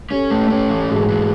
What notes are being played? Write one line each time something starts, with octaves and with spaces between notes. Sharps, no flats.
C#4 G4 A4
A3
C#4
E3
G#2 F#4 G#4
E3